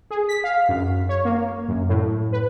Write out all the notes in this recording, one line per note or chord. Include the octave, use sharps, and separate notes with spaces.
G#4
B6
F5
F#2
C#5
A#3
F#2
A2
B4